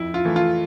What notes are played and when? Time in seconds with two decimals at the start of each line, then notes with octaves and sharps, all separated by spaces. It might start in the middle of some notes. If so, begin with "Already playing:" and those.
Already playing: F2 E4
0.14 F4
0.25 E3 A3
0.36 F4